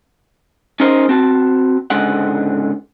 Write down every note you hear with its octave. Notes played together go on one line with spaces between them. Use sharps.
C#4 D#4 G#4 A#4 C5 D#5
C4 F#4 A5
C#2 G#2 D3 G#4 D#5 F#5